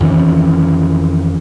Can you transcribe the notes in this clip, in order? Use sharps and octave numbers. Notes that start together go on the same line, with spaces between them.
F2 D#3 E3 C#4